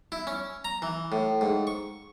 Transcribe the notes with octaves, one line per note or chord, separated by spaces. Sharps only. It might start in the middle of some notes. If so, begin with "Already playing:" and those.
E4
C#4
A#5
E3
A2
G#2
C#6